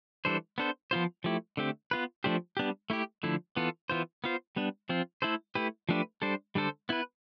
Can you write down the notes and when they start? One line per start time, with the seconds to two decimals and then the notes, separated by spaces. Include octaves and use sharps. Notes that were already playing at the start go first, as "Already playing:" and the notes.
0.25 E3 G3 D4 A4 C5
0.58 B3 D4 A4 C5
0.91 F3 B3 F4 C5
1.24 F3 A3 E4 G4
1.57 D3 A3 C4 G4
1.91 B3 F4 B4
2.24 F3 A3 D4 G4 C5
2.57 G3 B3 D4 G4
2.90 A3 E4 G4
3.23 D3 F3 A3 E4
3.56 E3 B3 F4 A4
3.90 E3 B3 F4 C5
4.24 B3 F4 C5
4.56 G3 B3 D4
4.89 F3 C4 F4
5.22 A3 E4 A4 C5
5.55 A3 E4 G4 B4
5.89 F3 A3 D4 G4 B4
6.22 G3 D4 A4 C5
6.55 D3 G3 D4 A4 C5
6.89 B3 E4 B4